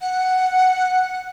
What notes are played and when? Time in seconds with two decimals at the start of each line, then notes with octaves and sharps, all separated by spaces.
0.01 F#5